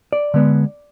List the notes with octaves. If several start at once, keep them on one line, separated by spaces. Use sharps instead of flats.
D5
D3 G#3 B3